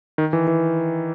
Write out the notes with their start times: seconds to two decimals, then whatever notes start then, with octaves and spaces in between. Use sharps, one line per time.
0.18 D#3
0.33 E3
0.47 E3